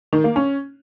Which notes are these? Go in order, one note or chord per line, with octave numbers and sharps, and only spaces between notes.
D#3
A#3
C#4